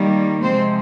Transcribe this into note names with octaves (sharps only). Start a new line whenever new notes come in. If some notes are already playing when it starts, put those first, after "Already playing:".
Already playing: D#3 G3 A#3
C3 F3 G#3 C4 C5